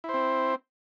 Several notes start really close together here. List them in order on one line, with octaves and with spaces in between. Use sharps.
E4 C5 C4